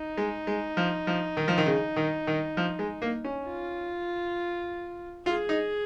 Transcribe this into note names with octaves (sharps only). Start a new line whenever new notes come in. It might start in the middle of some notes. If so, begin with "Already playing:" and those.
Already playing: D#4
G#3
G#3
F3
F3
D#3
F3
D#3
C#3
D#3
D#3
F3
G#3
A#3
C#4
F4
F4 G#4
D#4